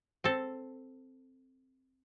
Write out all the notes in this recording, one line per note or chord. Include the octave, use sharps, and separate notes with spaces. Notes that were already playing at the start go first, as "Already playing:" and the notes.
C4 A4